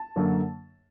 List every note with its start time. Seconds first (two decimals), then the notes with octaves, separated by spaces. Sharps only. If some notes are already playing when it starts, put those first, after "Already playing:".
Already playing: A5
0.16 F#2 D3 F#3 A#3